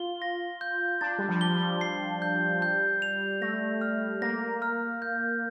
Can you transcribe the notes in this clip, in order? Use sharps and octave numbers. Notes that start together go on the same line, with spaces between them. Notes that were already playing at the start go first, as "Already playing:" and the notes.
Already playing: F4 G7
A#6
G6
D4 A6
G3
F3
G7
G3
C7
G6
G6
F7
A3 A#6
F6
A#3 A#6
F6
G6